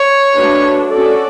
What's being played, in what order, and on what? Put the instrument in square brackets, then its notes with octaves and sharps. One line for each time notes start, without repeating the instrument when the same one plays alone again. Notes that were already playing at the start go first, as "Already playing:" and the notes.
Already playing: [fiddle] C#5
[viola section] A3 D4 F#4 B4
C#4 F#4 A4 D5